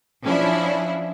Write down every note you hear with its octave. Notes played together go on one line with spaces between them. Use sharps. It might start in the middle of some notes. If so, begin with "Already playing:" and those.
F3 C#4 D4 E4